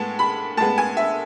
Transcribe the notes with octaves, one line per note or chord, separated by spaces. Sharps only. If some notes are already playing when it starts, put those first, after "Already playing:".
Already playing: A2 G#3 B3 A5
B5
A2 G#3 B3 A5
G#5
E5